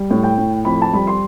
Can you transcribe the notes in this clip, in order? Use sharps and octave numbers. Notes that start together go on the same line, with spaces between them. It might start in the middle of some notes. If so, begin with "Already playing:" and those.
Already playing: G3
A2
G5
A2
F2 B5
A5
G3 B5
C6